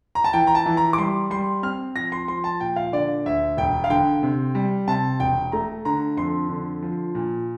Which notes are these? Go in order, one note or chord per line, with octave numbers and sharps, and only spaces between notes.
A#5
A5
E3 G5
A#5
A5
E3
A#5
D6
G3 C6
G3 C6
C4 F6
F3 A#6
C6
F3 C6
A5
A#2 G5
F5
D3 D5
D2 E5
E1 G5
F5
D3 G5
C3
G3
C3 A5
E1 G5
A3 A#5
D3 A#5
F2 C6
D3
F3
A#2